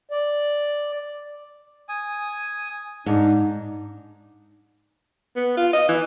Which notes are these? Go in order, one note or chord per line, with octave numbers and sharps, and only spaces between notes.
D5
G#5 D#6
G#2 D4 D#4
B3
F4
D#5
E3